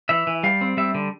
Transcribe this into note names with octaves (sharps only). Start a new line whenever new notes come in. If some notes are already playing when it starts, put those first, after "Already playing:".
E3 E5
E3
G3 F5
C4
G3 E5
D3